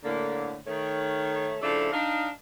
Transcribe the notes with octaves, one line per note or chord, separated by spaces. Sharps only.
A2 D3 A#3
D#3 A3 C#5
C#3 F3 A3 D4 E4 A4
D4 D#4 F5